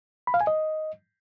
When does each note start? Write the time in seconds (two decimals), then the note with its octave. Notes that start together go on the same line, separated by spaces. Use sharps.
0.27 B5
0.34 F5
0.41 G#5
0.47 D#5